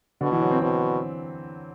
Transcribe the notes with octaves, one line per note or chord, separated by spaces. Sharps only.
B2 D3
E3
F#3
C4
B2 C4